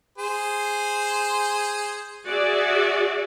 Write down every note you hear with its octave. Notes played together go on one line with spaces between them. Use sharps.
G#4 C5
F#4 G#4 D5 E5